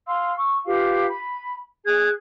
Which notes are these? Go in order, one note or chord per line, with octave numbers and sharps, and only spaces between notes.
F5 C6 E6
C#6 E6
F4 G4 B4 F5
B5
G#4 F#6 G#6